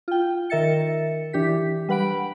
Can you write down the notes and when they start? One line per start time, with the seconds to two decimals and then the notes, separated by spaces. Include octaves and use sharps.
0.08 F4 G5
0.50 D#3 A#4 E5 A6 C#7
1.33 E3 D4 G4 B6
1.89 G3 B4 F#5 B5 D7